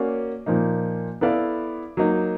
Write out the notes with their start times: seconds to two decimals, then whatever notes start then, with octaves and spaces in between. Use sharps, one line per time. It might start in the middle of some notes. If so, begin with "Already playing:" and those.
Already playing: A#3 C#4 F#4 D5
0.46 A#2 F3 A#3 D#4
1.21 B3 E4 A4 D5 F5
1.97 F#3 A#3 D#4